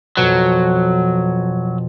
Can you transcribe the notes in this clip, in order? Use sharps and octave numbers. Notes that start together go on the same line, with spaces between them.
F2 B2 F#3